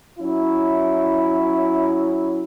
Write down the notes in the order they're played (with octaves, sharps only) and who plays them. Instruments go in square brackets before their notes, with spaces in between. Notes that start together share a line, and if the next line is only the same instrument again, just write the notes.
[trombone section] F#3 C#4 E4